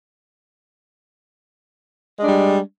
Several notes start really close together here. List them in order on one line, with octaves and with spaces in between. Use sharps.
G#3 D4 G3